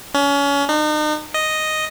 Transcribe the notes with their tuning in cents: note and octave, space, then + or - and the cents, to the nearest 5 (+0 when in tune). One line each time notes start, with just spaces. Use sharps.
C#4 +30
D#4 -40
D#5 +0